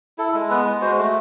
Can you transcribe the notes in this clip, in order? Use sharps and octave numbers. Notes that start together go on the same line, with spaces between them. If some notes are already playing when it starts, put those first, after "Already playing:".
E4 A4
G#3
B3 B4
G#3
F#4 C5
A3